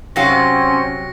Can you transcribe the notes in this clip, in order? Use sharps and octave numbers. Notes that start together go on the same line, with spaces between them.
C3 F#3 C4 C#4 F5 C6 A#6 C#7